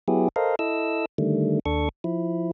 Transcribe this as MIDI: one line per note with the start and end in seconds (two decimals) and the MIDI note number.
0.08 0.29 54
0.08 0.29 59
0.08 0.29 64
0.08 0.29 67
0.08 0.29 68
0.36 0.56 69
0.36 0.56 70
0.36 0.56 72
0.36 0.56 75
0.36 0.56 77
0.59 1.06 64
0.59 1.06 69
0.59 1.06 75
0.59 1.06 88
1.18 1.60 50
1.18 1.60 51
1.18 1.60 55
1.18 1.60 57
1.66 1.89 39
1.66 1.89 62
1.66 1.89 69
1.66 1.89 85
2.04 2.51 53
2.04 2.51 64